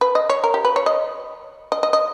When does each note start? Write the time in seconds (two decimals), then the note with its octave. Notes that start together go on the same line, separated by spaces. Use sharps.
0.01 B4
0.15 D#5
0.29 C#5
0.44 A#4
0.54 G4
0.65 B4
0.76 C#5
0.86 D#5
1.72 D#5
1.83 D#5
1.93 D#5